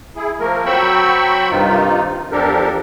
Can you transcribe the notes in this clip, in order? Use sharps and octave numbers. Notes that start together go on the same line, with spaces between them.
E4 G#4
F3 A3 A#3 A#4
F#3 C4 G5 B5 C#6 E6
G2 C3 D#3 D#4 F4
E2 F3 D4 G4 A4 A#4